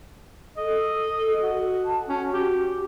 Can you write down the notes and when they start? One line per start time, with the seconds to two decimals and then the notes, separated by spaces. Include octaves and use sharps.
0.57 A4 D#5
1.42 F#4
1.85 A5
2.09 C#4 F#4
2.33 G4